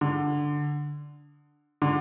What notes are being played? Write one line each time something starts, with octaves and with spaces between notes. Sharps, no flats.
D3
D3